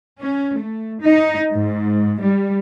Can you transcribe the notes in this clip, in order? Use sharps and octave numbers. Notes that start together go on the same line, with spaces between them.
C#4
A3
D#4
G#2
G3